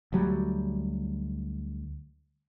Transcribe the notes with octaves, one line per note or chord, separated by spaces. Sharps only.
D2 F#3 G3